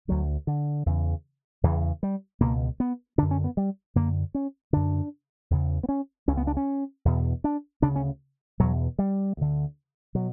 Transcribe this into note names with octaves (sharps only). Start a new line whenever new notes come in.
D2 D3 F#3
D3
E2 C#3
E2 C#3 E3
G3
C#2 B2 A#3
B3
F#2 D3 D4
C#4
B3
G3
F#2 D3 A#3
C#4
F#2 D3 D4
E2 C#3
B3
C#4
C#2 C#3 C#4
B3
D4
C#4
E2 B2
D4
D2 C#3 D4
C#4
E2 B2 F#3
G3
D2 D3
B2 F#3